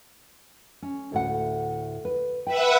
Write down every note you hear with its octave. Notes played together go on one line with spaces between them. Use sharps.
C#4
D2 A2 F#5
B4
B4 E5 F#5 G5